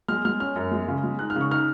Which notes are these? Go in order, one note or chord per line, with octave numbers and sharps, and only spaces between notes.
G#3 F6
G#3 F6
C#4 F6
F#2
G#3
C#3
G#3
D#4 F#6
F6
C#3 C#6
D#4 F6